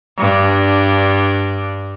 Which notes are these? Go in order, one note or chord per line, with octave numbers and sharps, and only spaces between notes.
G2 D4